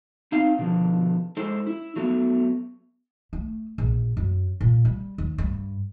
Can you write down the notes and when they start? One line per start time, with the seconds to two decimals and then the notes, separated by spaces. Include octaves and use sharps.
0.32 C4 D#4 F5
0.59 B2 D3 F3
1.37 G#3 E4 G#4 A4 C5
1.67 E4
1.96 F#3 A3 B3
3.33 A3
3.78 A#1
4.17 F#2
4.61 A#2
4.85 G3
5.18 D#2
5.38 G2